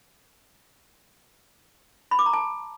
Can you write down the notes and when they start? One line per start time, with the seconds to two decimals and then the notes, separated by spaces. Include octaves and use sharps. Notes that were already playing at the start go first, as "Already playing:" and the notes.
2.11 B5
2.19 D6
2.26 A#5
2.33 A5